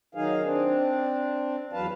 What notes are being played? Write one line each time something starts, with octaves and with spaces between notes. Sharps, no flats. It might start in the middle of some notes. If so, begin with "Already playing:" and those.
D#3 F#3 D#4 G#4 F5
C4 D4
E2 F#3 B4 F5 A5